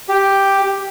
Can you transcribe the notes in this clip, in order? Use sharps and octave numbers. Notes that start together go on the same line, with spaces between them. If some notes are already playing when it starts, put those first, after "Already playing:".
G4